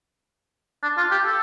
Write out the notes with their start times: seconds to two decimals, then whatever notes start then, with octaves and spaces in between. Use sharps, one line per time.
0.83 D4
0.97 F4
1.11 G4
1.26 A4